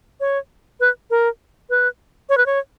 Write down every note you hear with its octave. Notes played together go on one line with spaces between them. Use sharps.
C#5
B4
A#4
B4
C#5
B4
C#5